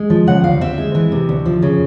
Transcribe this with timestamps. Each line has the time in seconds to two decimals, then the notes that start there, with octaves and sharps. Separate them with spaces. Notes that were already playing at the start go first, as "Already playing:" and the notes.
Already playing: G#3
0.10 F3
0.27 C#3 F#5
0.44 D2 F5
0.61 C4 E5
0.78 G#3
0.95 E3
1.12 C3
1.29 D2
1.45 F3
1.62 C#3